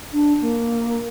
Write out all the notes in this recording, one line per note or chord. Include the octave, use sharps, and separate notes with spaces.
D4
A#3